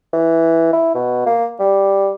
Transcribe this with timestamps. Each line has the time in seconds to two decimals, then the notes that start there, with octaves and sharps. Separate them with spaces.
0.13 E3
0.73 E4
0.95 B2
1.26 A#3
1.60 G3